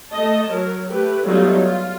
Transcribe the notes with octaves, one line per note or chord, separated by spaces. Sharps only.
A3 D#5 A5
F#3 A#4
A3 G4 B4
F#3 G3 A3 B3 D#4 F4
F4